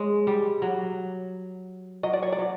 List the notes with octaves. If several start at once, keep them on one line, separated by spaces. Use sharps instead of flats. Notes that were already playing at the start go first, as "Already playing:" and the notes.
Already playing: G#3 C#5
G3
F#3
F#3 D#5
D5
C#5
D5
F#3